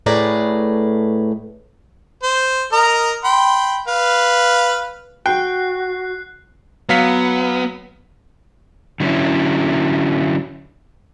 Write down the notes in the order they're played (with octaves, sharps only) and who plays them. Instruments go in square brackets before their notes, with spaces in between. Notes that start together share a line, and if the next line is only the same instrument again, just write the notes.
[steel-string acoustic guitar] A2 A3 G#4 B4 D5 A#5
[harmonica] C5
A#4 D#5 A#5
G5 B5 C6
B4 F5
[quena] F#4 [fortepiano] G5 [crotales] F#6 C7
[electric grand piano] F#3 F5 B6 [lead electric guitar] B3
[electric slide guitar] D3 F#3 A#3 C#4 E4